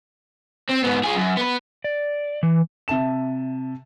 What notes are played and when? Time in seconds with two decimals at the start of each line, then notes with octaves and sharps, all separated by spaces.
0.70 C4
0.84 G#2 B3
1.05 F4 G#4
1.16 F#2
1.37 B3 B4
1.84 D5
2.43 E3
2.88 C3 E5 A5 E7